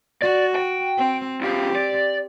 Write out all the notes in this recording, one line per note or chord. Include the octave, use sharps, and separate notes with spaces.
F#4 D5
G5
C4
C2 F3 C4 G4
D5